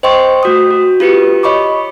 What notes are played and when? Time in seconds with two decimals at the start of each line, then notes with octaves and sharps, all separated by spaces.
0.03 C5 D#5 G5 C6 C#6
0.43 A3 F#4 D#6
0.71 F#4
1.00 F4 G4 B4 C#7
1.43 C#5 D#5 B5 C#6 D6